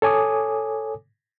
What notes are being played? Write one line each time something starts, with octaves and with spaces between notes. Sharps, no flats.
A4 C#5 G#5 D6 D#6